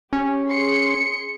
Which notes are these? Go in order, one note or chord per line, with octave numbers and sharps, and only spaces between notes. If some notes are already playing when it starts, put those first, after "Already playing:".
C#4 G4
G#4 C6 C#7